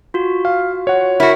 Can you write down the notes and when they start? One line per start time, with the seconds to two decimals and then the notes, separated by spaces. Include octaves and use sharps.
0.14 F4 F#4
0.45 F5
0.87 C#5 F#5
1.20 E4 F#4 A#4